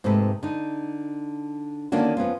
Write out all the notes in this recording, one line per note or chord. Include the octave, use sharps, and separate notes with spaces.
G#2 C3 A3 A4 B4
D3 D#4
D3 D#3 A#3 C#4 D4 F#4
F2 B3 C#4 F4